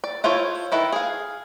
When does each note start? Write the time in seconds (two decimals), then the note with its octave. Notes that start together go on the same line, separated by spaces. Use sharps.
0.04 D5
0.24 E4 F4 A4 C5 C#5
0.72 D#3 E4 A4 B4
0.92 G#4 F5